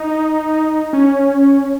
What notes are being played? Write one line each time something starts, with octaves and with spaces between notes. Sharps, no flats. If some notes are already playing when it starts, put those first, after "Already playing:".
Already playing: D#4
C#4